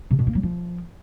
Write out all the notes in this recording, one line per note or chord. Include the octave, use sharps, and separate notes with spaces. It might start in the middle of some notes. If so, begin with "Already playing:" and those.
C3
B2
A#3
F#3
F3